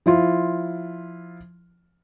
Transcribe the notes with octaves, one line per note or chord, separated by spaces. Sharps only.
F3 E4 F4